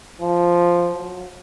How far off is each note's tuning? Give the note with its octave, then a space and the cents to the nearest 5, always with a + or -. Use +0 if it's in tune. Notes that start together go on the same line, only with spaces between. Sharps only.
F3 -5
F#3 -30